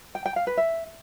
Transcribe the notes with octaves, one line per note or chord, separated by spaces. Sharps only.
G5
G5
F5
B4
E5